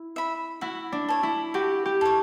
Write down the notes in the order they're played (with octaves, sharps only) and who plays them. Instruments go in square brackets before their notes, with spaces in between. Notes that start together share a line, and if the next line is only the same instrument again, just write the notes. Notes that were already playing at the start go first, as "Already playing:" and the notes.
Already playing: [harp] E4
[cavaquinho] E5 B5
[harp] E4 [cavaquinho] F#4
[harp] D4
[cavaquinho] A4 C#5
[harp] E4
[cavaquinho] F#4 [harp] G4
[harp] G4
[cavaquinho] A4 C#5